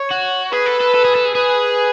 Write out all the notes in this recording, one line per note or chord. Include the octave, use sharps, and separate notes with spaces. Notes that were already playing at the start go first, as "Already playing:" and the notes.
Already playing: C#5
F#4
G#4 B4
A4
A4
A4
G#4
A4
G#4
G#4 B4